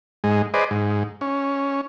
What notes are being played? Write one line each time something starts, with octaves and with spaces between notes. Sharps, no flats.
G#2 G#3
G#4 B4 C5 D5 D#5
G#2
C#4